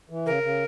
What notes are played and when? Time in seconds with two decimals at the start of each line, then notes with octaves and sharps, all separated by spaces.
0.09 E3
0.26 C#3 A#4
0.43 C#3